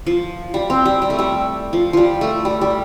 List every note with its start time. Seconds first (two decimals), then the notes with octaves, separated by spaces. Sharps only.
0.06 F3
0.54 G3
0.70 C4
0.85 G3
1.02 G3
1.10 A3
1.19 G3
1.73 F3
1.93 F3 G3
2.21 A3
2.45 G3
2.61 G3